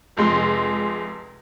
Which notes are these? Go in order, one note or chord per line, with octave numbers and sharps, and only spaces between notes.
F1 F2 C3 G#3 C6